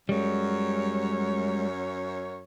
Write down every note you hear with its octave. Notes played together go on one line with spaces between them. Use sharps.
F#2 G3 G#3 C#5